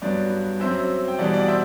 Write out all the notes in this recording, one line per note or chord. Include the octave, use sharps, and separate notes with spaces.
G2 F#3 B3 D5
F#2 F#3 C4 C5 E5
G5
E2 B2 G3 D5 F#5
D5 F#5
C5 E5